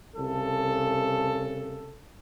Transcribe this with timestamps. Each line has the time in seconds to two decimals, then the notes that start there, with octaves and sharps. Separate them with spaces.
0.16 C2 C#3 A4